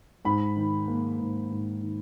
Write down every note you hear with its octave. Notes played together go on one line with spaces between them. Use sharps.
G#2 B5
D#3
A#3
G#2
G#2
D#3